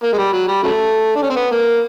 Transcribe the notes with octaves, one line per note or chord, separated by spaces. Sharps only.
A#3
G#3
G3
F#3
G3
C#3 F#3 A3
D4
C#4
C4
B3
A#3